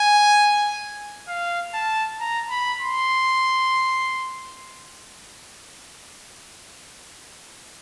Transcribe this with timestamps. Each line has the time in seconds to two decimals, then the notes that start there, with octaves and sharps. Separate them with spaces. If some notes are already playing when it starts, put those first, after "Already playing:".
Already playing: G#5
1.28 F5
1.74 A5
2.20 A#5
2.50 B5
2.82 C6